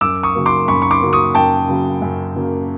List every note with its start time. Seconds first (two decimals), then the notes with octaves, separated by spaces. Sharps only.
0.01 F#2 D6 E6
0.23 C#6 D#6
0.35 C#3 F#3 A#3
0.46 C6 D6
0.68 F#2 B5 C#6
0.82 C#6
0.91 C6 D6
1.02 C#3 F#3 A#3
1.13 C#6 D#6
1.35 F#2 G5 A5
1.69 C#3 F#3 A#3
2.02 F#2
2.35 C#3 F#3 A#3